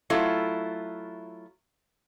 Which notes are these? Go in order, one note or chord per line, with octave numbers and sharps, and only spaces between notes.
F#3 A3 E4 F4